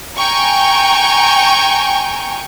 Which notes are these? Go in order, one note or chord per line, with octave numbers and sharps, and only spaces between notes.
G5 G#5 A#5 C#6